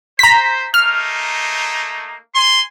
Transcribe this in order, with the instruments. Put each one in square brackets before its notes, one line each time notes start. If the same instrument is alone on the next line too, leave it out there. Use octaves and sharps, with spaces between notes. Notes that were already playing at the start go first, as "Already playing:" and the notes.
[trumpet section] C5 [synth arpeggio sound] A#5 B6
[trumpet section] A3 A#3 D#4 [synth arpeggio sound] F6
[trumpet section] G#5 C6